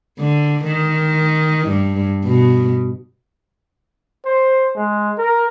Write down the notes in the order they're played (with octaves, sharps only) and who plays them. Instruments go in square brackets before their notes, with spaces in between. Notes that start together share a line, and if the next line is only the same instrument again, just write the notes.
[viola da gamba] D3
D#3
G2
B2
[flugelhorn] C5
G#3
A#4